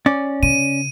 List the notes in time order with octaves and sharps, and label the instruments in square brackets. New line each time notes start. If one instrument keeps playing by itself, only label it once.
[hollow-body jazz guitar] C#4 D5
[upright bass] C#3 [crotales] D#7